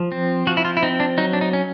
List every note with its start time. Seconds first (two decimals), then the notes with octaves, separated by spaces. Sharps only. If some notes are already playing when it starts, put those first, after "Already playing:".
Already playing: F3
0.12 C4
0.47 F3 F#4
0.57 E4
0.65 F4
0.77 E4
0.83 C4 D#4
1.00 D4
1.18 F#3 D#4
1.33 D4
1.41 D#4
1.53 C#4